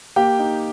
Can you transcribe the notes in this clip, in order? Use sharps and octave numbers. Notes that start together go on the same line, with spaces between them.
A#3 G4 G5
D#4